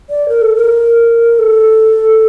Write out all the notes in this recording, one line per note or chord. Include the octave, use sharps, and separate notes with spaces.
D5
A#4
A4
A#4
A4